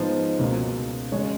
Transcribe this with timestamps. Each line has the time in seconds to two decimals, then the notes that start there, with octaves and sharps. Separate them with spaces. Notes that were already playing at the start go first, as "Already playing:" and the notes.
Already playing: G#2 F3 B3 D#5
0.39 C#2 B2 F#3 A#3
1.12 C#3 G#3 C#5